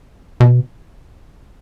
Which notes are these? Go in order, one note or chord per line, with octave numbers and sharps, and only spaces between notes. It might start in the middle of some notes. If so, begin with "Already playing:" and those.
B2